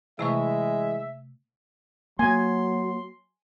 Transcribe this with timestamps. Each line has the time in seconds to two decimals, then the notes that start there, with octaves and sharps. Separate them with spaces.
0.19 C3 E3 G#3 A3 E5 C#6
2.19 F#3 A#3 G#5 C6